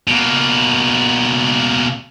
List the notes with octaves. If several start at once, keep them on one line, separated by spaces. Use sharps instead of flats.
B2 A#3